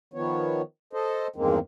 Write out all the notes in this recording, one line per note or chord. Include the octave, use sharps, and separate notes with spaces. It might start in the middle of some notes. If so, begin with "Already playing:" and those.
D#3 F3 B3 C#5
A4 C5 D#5
E2 G2 D#3 G#3 A#3 C4